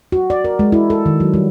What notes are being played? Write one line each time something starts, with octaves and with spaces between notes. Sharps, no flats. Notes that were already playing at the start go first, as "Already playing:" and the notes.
F#4
D5
A#4
G#3
E4
A4
D#3
F#3
G3